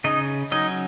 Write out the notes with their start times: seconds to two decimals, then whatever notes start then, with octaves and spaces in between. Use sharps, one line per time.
0.04 C#3 D#4 D#5
0.52 F#3 C#4 D#4 D#5